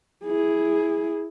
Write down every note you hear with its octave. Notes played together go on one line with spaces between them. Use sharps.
E4 G#4